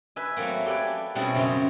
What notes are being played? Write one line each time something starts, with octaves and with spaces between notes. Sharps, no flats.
B4 E5 G#5
F#3 A3 A#3 C4
G4 A4 B4 D5 G#5
B2 G3 C4 C#4 E4 G#4
F#2 C#3 C4 C#4 C5 C6